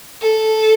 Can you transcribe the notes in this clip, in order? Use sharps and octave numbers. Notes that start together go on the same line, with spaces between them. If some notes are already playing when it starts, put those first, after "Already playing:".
A4